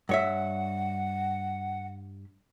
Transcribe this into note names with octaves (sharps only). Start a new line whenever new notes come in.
G2 C#5 E5 F#5